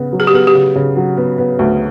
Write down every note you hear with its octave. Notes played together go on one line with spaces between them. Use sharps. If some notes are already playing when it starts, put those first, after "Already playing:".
Already playing: C#3 B3
F#3
G#4
G4
B3 G#4
G4
C#3
C#3
F#3
B3
B3
D2